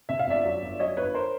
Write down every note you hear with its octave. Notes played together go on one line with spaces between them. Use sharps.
C3 E5
F5
G1 D5 E5
F#2
G1
F#2 C#5 D#5
G1 B4 C#5
A#4 C5